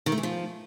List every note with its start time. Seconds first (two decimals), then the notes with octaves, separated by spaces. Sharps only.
0.06 D#3
0.12 A3
0.18 E3
0.23 F3